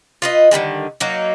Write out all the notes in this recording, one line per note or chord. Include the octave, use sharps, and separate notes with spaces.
F4 B4 D#5
D3 D#3 G3 G#3
F#3 A#3 D#4